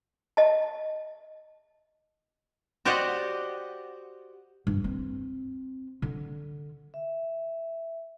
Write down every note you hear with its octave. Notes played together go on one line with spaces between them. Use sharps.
D#5 A5
F#4 G4 C5 D5 D#5 F#5
G2
C4
D3
E5